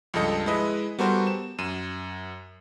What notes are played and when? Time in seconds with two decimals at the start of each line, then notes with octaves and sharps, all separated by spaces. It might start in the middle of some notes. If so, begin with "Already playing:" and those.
0.14 C#2 G2 F3 A4 D#5 C#7
0.46 G#3 E4 B4 D#5 E5
0.99 G3 B3 F#4 A4 A#4 C5
1.27 E7
1.58 F#2 D#7 E7